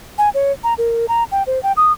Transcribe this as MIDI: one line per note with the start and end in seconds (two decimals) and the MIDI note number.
0.18 0.29 80
0.34 0.52 73
0.64 0.74 82
0.78 1.06 70
1.09 1.24 82
1.32 1.43 79
1.47 1.61 72
1.63 1.72 79
1.77 1.92 87